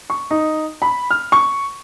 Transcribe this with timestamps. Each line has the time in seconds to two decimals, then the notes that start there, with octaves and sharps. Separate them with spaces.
0.10 C#6
0.31 D#4
0.82 B5
1.11 F6
1.32 C#6